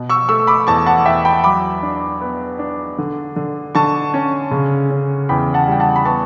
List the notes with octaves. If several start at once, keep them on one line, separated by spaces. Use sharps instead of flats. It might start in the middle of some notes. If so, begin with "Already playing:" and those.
Already playing: B2
C#6 E6
A3 C#6 E6
B5 D6
E2 A5 C#6
F#5 A5
E2 E5 G5
G5 B5
F#3 B5 D6
D4
B3
D4
D3
D3
D3 A5 C#6
C#4
C#3
C#4
E2 G5 B5
F#5 A5
G3 G5
F#5 A5
B5
B3 A5 C#6